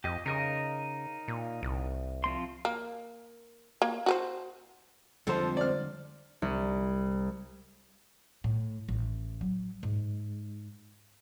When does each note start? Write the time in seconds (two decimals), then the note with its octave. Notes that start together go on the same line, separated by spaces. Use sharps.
0.04 F2 G4 D#5
0.26 C#3 D#4 A#4 D#5
1.28 A#2
1.63 C2
2.24 F3 C4 C6
2.65 A#3
3.82 A#3
4.06 F#4 B4 C5
5.27 F2 D3 F3 G3 G#3 A4 C5
5.57 D5 F6
6.42 C2
8.44 A2
8.89 A1
9.41 F#3
9.83 G#2